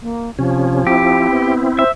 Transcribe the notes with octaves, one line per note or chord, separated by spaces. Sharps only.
A#3
C3 F3 C#4
C4 E4 G4
B3
C5 E5